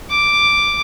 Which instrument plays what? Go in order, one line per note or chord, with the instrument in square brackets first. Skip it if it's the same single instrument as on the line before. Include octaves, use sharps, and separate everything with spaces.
[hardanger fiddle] D6